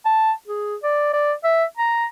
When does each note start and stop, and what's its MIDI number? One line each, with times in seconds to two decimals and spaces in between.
0.05 0.32 81
0.48 0.76 68
0.83 1.12 74
1.14 1.33 74
1.44 1.64 76
1.78 2.06 82